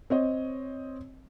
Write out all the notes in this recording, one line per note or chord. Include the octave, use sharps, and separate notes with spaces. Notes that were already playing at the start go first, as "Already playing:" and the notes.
C4 C#5 D#5